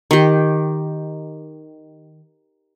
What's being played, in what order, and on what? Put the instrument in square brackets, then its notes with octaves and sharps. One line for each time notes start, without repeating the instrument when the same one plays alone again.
[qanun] D#3 G4